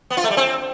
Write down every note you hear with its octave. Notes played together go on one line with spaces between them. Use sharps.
B3
F4
A3
G3
C4